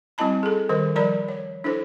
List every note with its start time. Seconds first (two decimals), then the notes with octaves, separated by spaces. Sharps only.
0.18 G3 C4 E4 D#5 A5 B5
0.43 G#4 A4
0.69 D#3 G3 A#4 C5
0.95 F3 G3 A#4 D5 A#5 B5
1.28 C#5
1.64 D4 E4 A4 C5